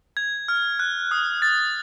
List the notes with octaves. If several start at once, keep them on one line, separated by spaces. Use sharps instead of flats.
G#6
F6
F#6
D#6
A6